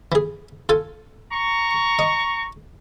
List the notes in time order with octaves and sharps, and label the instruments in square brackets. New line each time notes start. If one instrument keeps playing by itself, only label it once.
[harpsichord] E3 G#4
F4 A4 G#5
[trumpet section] A#5 C#6
[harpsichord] D#5